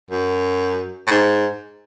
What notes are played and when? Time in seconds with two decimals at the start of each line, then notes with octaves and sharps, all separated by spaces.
0.10 F#2
1.07 A2
1.11 G#2